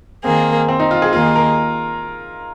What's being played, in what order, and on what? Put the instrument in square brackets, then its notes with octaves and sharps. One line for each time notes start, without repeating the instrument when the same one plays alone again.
[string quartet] D#3 A#3 G#4 [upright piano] C4
[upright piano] C4
D#4
F4
G#4
[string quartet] D#2 D#3 A#3 G#4 D#5 [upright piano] F4
[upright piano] A#4